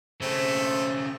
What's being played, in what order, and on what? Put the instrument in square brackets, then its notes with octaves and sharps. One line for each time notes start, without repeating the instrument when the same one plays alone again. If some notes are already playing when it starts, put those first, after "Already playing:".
[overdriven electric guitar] C#3 C4 [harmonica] A3 [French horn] C5